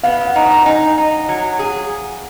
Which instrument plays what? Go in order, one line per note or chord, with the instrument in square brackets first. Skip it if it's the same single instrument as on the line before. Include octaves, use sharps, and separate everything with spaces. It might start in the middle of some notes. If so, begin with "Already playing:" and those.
[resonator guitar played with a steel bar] B3 [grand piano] F5
[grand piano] F#5
[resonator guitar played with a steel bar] D#4
[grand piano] A#5
A#5
[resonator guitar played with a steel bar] D#4 [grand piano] G#5
[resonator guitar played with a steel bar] D#4
F#3
G#4